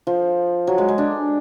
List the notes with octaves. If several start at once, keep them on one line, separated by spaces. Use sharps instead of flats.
F3
F#3
G#3
G#3
D4